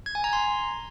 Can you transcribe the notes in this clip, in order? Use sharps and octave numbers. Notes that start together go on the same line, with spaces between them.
G#6
G#5
A#5
C6